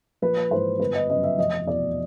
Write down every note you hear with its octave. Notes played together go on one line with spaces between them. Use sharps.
A#1 B4
G#2 E3 C5
G1 B4
D#5
F#2 C#3 D#5
E5
F1 D#5
E2 B2 D5